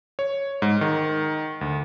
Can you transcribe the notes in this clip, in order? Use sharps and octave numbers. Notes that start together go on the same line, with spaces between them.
C#5
G#2
D#3
D2